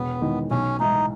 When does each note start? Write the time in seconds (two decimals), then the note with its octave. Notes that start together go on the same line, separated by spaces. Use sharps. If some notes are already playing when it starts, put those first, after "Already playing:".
Already playing: E1 B3
0.21 E2 D#3 G#3
0.51 B1 C#4
0.80 A2 E3 G#3 D#4